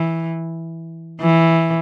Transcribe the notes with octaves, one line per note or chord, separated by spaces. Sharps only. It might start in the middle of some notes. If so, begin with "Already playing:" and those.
Already playing: E3
E3